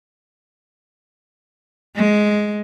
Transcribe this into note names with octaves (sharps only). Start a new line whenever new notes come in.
G#3